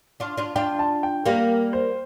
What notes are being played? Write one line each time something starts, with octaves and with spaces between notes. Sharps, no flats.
D4 F4
D4 F4
D4 F4 G5
A5
G5
G3 A#3 F5
C5